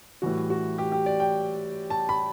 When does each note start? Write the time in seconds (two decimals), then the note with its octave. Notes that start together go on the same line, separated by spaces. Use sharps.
0.22 A2 E3 G3 F#4
0.50 F#4
0.78 G4
0.92 G4
1.06 D5
1.20 G5
1.90 A5
2.09 B5